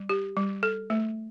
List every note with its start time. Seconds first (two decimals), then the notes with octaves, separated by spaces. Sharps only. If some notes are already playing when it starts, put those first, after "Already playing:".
Already playing: G3
0.09 G4
0.37 G3
0.63 A4
0.90 A3